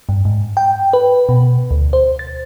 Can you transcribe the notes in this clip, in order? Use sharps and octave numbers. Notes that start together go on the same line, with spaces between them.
G2
G#2
G5
B4
B2
D2
C5
A6